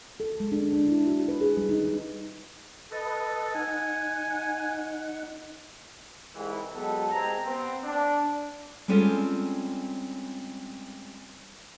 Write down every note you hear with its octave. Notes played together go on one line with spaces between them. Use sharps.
A4
G#3
D4
D4
E4
F#4
B4
G#4
G3
D#4
D#4
A4 B4 D#5
D#4 F#5 G#5
C2 G#2 E3
F#3 G#3 B3 F#4 G4 A4
C2 C3 G#3 G5 G#5 A#5
B3 C4
D4
G3 G#3 C4 C#4 F4 A4